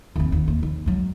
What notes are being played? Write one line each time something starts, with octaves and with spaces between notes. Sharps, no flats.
D#2 C4
D#2
A#3
D#2
F#3 G#3